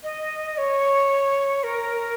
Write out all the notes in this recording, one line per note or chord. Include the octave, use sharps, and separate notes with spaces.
D#5
C#5
A#4